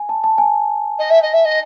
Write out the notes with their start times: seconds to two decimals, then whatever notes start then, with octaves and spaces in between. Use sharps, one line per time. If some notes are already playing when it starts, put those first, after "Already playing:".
Already playing: G#5
0.09 A5
0.24 A5
0.38 G#5
0.98 D#5
1.10 E5
1.22 D#5
1.33 E5
1.45 D#5